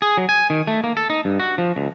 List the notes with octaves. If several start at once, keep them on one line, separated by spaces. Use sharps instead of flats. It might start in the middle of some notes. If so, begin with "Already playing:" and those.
G#4
F#3
G#5
D#3
A3
A#3
A4
D#4
G2
F#4
F3
C#2